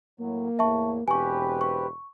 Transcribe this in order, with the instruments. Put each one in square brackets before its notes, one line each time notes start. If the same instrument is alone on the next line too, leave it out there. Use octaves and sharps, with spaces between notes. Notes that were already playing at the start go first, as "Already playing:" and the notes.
[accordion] A2 F#3 [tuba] A#3
[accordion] E2 A2 [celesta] E5 A5 C#6
[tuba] E1 [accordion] C4 G4 B4 [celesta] G#5 C#6
[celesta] C#6